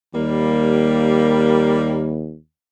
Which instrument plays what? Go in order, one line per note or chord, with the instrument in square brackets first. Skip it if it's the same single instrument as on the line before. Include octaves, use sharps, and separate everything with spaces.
[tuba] D#2 [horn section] G3 A#3